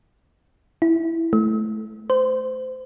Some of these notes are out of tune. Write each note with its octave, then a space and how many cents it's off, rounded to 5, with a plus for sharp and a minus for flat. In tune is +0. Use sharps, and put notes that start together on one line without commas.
E4 +0
A3 -15
C5 -25